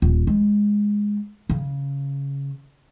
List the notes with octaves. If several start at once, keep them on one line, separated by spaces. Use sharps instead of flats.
D#1
G#3
C#3